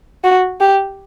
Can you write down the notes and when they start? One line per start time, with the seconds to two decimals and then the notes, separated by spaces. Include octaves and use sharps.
0.24 F#4
0.61 G4